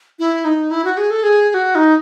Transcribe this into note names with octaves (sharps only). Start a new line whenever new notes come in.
E4
D#4
E4
F#4
G#4
A4
G#4
G#4
F#4
D#4